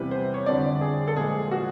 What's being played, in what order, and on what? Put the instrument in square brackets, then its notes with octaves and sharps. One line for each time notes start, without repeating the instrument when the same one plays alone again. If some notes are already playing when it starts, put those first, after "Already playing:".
Already playing: [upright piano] E2 C3 E3 G3 B4
C5
C#5
F2 D3 G3 D5
G#4
A4
A#2 F3 G#3 G#4
F#4